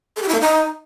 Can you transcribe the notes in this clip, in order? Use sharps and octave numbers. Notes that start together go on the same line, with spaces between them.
A4
G4
E4
A#3
D#4